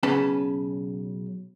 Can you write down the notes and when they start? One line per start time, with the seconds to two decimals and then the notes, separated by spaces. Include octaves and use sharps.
0.03 B1 C#3 C#4 B4 A5